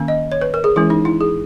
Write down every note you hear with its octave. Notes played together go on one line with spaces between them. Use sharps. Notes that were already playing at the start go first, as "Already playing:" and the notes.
Already playing: D#3 A#3 C#4
D#5
C#5
B4
A#4
G#4
E3 G#3 C#4 E4
D#4
E4
G#4